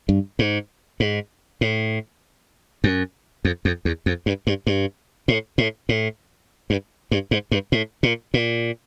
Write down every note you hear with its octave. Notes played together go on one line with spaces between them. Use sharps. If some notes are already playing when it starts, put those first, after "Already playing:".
G2
G#2
G#2
A2
F#2
F2
F2
E2
F2
G2
G2
G2
A2
A2
A2
G2
G2
G#2
G2
A2
A#2
A#2